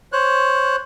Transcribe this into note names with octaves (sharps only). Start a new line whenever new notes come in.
C5 C#5 F#6